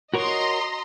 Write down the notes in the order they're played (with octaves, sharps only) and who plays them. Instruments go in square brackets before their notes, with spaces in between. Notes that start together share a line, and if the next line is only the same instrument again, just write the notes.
[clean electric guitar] F#4 A#4 C#5 [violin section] D#5 A#5 C6